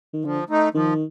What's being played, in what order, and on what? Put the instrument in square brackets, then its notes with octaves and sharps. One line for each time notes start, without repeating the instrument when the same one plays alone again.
[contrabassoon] D#3
[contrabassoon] D3 [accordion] F3
[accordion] A3 D#4
[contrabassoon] D#3 [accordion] F3